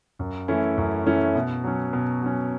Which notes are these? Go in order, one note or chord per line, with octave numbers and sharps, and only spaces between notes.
F#2
E3 A3 C#4 E4
F#2
E3 A3 C#4 E4
B2
F#3 C#4
B2
F#3 C#4